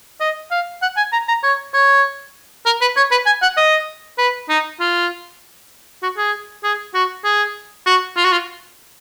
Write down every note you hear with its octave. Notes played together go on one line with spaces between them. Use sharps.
D#5
F5
F#5
G#5
A#5
A#5
C#5
C#5
A#4
B4
C#5
B4
G#5
F#5
D#5
B4
D#4
F4
F#4
G#4
G#4
F#4
G#4
F#4
F4
F#4
F4